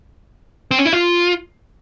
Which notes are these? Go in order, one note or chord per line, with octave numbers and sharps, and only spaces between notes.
C4
C#4
E4
F4